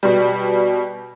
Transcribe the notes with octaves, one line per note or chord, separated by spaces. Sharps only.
B2 G3